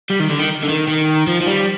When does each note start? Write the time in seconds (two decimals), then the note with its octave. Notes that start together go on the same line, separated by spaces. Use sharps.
0.10 G3
0.20 D#3
0.30 D3
0.39 D#3
0.63 D3
0.69 D#3
0.88 D#3
1.27 F3
1.41 F3
1.46 G3